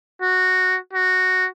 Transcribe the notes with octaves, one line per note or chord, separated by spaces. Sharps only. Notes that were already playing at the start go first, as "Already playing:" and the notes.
F#4
F#4